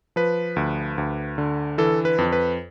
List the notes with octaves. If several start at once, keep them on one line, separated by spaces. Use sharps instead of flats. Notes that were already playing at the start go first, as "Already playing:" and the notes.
F3 B4
D2
D2
D3
E3 A4
B4
F2
B4